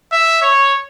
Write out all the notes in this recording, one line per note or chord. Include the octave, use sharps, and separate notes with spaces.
E5
C#5